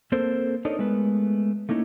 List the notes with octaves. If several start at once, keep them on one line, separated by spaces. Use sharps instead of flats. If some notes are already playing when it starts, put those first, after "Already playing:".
A#3 C4 A4 A#4 C5
D4 D#4 A4 A#4 C#5 D#5
G#3 A3 B3 A#4 B4
A3 A#3 C#4 D#4 E4